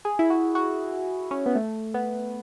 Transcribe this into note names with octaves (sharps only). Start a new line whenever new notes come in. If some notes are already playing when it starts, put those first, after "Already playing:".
G#4
E4
F#4
F#4
C#4
B3
A3
B3